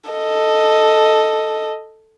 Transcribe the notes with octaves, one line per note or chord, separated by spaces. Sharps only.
A4 D#5